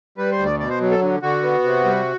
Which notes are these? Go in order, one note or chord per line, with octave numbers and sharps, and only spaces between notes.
G3 B4
C5
D2
D5
B2 D5
C5
F#3
A4
D3
D3 F#4
B3
C3
G3